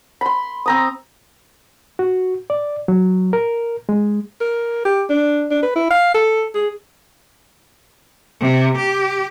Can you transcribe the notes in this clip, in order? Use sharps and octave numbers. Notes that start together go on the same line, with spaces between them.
B5 C6
C4 A#5 D#6
F#4
D5
F#3
A#4
G#3
A#4
G4
D4
D4
B4
E4
F5
A4
G#4
C3
G4